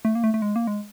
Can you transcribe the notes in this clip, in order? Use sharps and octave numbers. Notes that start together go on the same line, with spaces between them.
A3
A#3
A3
A3
G#3
A#3
G#3